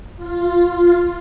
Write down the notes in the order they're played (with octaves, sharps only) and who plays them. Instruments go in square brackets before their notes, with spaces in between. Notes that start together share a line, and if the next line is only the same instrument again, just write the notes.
[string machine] F4